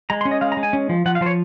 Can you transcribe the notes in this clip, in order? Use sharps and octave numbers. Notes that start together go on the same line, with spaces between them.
G#3 A#5
C6
C#4
D#5
G#3 F5
A#5
G#3
G#5
C#4
F3
F3 F#5
F5
F3 C5
C#5